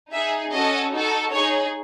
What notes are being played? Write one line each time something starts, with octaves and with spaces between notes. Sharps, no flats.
D#4 G#4 E5
C#4 F#4 A4 D#5
D#4 F#4 A4
D#4 G#4 C#5